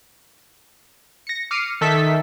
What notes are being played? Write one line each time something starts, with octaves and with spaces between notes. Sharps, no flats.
A#6 C#7
D6 F6 C7 C#7 D#7
D#3 A4 E5 B6